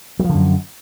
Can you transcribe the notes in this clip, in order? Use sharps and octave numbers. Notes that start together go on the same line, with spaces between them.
F#2 D3 F3 F#3